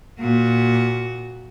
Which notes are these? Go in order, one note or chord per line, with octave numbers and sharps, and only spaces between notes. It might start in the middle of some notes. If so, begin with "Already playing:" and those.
A#2 F#4